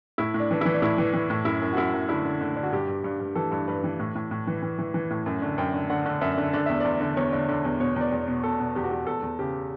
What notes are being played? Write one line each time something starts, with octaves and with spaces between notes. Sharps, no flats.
A2 E4
A2
D4
E3 D4
E3 E4
D4
A2 E4
E3
E3
A2
F#2 E4
F#2
F#4
F#2 E4
F#2
D3 E4
D3
D3
D3
F#4
G2 G4
G2
G2
G2
E3 A4
G2
G2 B4
E3
A2
A2
A2
E3
E3
E3
E3
A2
F#2
D3
F#2 G5
D3
D3 F#5
D3
F#2 E5
D3
D3 D5
E2 E5
E2 D5
D3
E2 C#5
D3
D3
E2
B2 C#5
E2 D5
E2
B2
B2 A4
B2
E2 G4
F#4
E2 G4
E2 A4
E2
C#3 G4